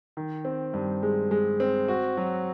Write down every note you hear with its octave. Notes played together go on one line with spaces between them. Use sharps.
D#3
C4
G2
G#3
G#3
C4
F#4
F#3